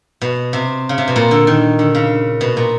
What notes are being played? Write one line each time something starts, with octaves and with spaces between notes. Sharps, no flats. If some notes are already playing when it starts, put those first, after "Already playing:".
B2
C3
C#3
C3
B2
A#2
D3
D#3
D3
C#3
B2
A#2